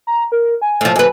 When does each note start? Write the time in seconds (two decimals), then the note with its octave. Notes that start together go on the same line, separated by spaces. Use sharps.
0.07 A#5
0.32 A#4
0.62 G#5
0.81 A2 F3
0.96 F#2 B4 G#5